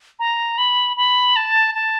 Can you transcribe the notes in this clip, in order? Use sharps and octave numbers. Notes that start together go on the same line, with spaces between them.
A#5
B5
B5
A5
A5